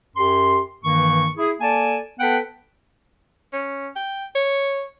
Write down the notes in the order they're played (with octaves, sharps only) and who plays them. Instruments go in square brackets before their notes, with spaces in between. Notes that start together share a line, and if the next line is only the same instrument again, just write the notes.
[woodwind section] F#2 G4 C6
G2 D#3 E3 A#3 C#6
E4 G#4
A#3 A4 D5 G#5 A5
B3 A4 B4 F#5 G5
[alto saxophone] C#4
G5
C#5